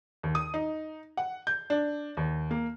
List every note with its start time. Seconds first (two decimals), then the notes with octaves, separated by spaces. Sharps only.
0.23 D#2
0.35 D#6
0.54 D#4
1.17 F#5
1.47 G6
1.70 D4
2.17 D#2
2.51 A#3